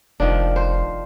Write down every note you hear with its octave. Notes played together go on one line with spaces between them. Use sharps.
F1 D#3 F3 D4
C5